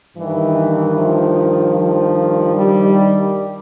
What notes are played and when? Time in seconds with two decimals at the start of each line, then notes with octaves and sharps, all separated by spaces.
0.16 G2 D#3 E3
0.95 F3
1.75 F3
2.55 G3